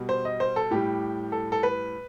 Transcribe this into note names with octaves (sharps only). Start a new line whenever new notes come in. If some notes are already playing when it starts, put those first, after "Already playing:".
Already playing: B2 G3
C5
D#5
C5
A4
A2 G3 G4
A4
A4
B4